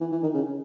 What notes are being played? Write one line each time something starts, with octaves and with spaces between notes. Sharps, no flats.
E3
E3
D#3
C#3